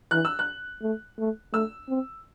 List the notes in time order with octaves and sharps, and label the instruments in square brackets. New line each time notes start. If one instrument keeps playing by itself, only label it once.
[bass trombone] E3 [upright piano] F#6
[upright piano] E6
F#6
[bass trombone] A3
A3
[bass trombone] A3 [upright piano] E6
[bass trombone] C4